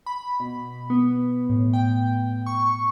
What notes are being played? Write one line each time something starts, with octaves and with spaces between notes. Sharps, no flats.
B5
B2
B3
A2
G5
C#6